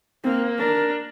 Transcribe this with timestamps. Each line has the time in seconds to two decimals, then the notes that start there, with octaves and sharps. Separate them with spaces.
0.24 A#3 C4
0.59 D4 A#4